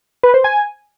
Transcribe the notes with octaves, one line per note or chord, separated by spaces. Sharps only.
B4
C5
G#5